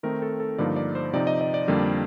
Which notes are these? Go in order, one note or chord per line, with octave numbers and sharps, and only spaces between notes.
D#3 A3 C4 D#4 A#4
A4
A4
G2 D3 F3 A#3 D#4 D5
D5
C5
C3 F3 C4 D#4 D5
D#5
D#5
D5
F2 D3 G3 A#3